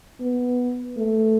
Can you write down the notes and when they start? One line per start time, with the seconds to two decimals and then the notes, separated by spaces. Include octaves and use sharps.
0.21 B3
0.98 A3